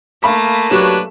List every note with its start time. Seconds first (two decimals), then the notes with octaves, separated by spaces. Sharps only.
0.23 A3 A#3 F5 B5 B6
0.71 F#3 D4 G4 B4 C#5 E7